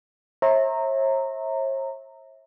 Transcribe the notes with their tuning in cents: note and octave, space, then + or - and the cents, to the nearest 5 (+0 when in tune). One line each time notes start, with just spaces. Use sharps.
C#5 -45 E5 -20 A#5 -15